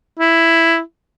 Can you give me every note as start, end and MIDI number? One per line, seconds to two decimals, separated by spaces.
0.20 0.79 64